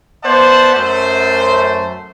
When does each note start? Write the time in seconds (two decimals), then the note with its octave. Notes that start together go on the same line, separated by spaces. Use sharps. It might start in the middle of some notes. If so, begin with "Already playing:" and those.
0.24 B3 C5 D5 E5 F#5 A5
0.75 F#2 A3 C5